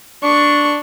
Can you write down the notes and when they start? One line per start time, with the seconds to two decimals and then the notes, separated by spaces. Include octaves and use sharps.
0.24 D4 C#6